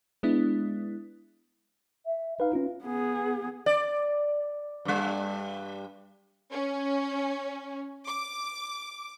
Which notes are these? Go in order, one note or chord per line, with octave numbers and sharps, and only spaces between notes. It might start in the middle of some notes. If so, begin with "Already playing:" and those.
G#3 B3 D4 E4
E5
D#4 B4 F5
C#4 F4
B3 G#4
D5
G2 G3
C#4
D6